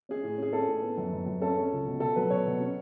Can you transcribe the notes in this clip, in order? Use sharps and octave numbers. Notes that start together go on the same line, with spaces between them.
C#4 G#4
A2
C#4 G#4
C#4 A4
A2
B3
F#2
F#2
F#2
C#4 A4
C#4
C#2
B2
B2 A4
F#3 B4
B2 C#5
B2
C#4